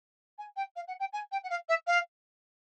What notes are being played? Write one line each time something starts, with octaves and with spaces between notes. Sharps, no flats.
G#5
G5
F5
F#5
G5
G#5
G5
F#5
F5
E5
F5